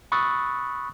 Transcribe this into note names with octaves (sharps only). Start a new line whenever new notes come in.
B5 C#6 D#6 E6 F#6 A6